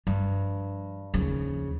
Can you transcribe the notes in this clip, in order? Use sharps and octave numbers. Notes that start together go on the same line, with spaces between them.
G2 F3
D#2 C#3 F3